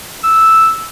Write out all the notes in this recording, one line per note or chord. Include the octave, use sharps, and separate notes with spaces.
E6